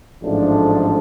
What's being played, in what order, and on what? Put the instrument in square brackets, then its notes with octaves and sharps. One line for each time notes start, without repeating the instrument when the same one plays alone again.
[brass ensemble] A1 G#2 F3 A3 D4